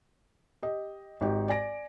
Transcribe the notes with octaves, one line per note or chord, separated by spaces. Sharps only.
G4 D#5
G#1 D#4 G4
D5 G#5 A#6 D7